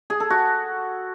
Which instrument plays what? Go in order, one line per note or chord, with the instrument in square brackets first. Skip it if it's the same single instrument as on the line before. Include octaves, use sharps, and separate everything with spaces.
[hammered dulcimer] G#4
A4
F#4